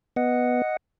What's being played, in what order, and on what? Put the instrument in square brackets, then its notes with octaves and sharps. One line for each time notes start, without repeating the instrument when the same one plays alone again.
[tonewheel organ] B3 D#5 F#5